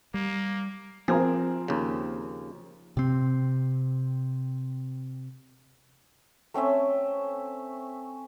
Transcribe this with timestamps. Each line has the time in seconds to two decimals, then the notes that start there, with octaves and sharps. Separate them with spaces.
0.14 G3 A#3
1.08 F3 C4 G#4 A#4
1.68 D#2 C#3
2.97 C3 C4
6.54 A3 C4 C#4 E5